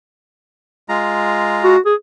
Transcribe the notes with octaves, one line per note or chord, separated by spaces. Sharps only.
G#3 F4 A#5
F#4
G#4